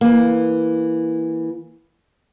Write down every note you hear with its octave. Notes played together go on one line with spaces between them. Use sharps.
E3 A#3